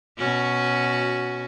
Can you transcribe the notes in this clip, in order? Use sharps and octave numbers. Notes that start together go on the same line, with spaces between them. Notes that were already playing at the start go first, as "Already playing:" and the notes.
B2 C#4 F#4